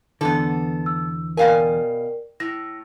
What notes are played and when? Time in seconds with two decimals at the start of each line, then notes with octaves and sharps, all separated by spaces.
0.21 E2 D3 B3 A4
0.86 E6
1.37 B2 A#4 D5 F5 G5 G#5
2.40 A2 A#6